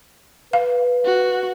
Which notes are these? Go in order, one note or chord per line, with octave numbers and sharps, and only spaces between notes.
B4 F5
F#4